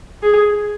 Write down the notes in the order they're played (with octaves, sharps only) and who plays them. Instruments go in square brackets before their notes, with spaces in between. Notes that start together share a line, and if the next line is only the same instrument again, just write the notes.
[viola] G#4